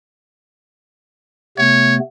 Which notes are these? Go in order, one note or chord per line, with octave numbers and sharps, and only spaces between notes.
C3 A3 B3 C#5